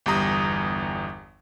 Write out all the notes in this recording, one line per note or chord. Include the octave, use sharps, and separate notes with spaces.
G1 E2 G3 A#5 D#6